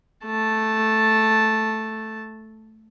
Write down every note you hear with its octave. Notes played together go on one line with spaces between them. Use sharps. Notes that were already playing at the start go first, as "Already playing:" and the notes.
A3 A5